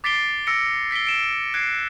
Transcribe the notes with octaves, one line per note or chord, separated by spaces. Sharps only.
D6 A6 B6 C7 D7 G7
E6 A#6 C#7 D7
A6 B6 C7 D7 G7
D7 E7
F#6 G#6 C7 D7